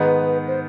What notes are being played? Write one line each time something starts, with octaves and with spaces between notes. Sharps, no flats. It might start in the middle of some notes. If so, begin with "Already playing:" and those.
Already playing: G#2 D#3 G#3 B3 D#4 B4
C5